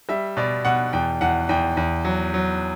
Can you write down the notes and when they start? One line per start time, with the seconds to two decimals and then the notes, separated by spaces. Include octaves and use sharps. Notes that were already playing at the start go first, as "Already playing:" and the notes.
0.09 G3 E5
0.37 B2 D5
0.65 B2 F#5
0.93 E2 G5
1.21 E2 F#5
1.49 E2 G5
1.77 E2
2.05 F#3
2.34 F#3